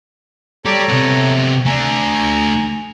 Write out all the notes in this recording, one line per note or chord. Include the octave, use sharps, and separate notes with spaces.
G4 A4 C#5 D5 A#5
C3 B3
A3 D4 G#5 A#5